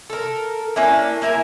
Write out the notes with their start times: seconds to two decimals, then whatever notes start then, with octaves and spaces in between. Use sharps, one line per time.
0.10 A4 A#4
0.76 A#3 C#4 D4 E4
1.22 A#3 E4 A#4 G#5